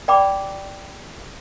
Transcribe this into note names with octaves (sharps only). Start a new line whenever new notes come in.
D5 G5 B5 D6